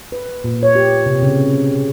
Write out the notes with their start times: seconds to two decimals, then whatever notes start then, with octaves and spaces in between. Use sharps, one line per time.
0.12 B4
0.44 A#2
0.63 C#5
0.75 G4
1.06 C3
1.22 C#3